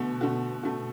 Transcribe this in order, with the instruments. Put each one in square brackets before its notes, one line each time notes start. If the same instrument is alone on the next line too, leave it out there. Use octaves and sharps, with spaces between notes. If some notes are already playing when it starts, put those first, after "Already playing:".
Already playing: [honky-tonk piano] B2 [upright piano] D3 A3 F#4
[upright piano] D3 A3 F#4
D3 A3 F#4